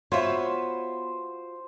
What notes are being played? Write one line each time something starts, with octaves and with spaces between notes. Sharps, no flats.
B3 F4 F#4 C5 C#5 E5